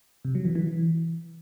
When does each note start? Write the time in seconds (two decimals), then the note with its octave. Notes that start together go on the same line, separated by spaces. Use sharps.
0.25 C3
0.35 F#3
0.45 E3
0.55 E3